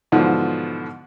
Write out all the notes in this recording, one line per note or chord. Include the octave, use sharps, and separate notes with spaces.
G#2 B2 D3 E3 F3